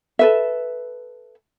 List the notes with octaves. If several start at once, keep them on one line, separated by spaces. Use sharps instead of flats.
A4 B4 E5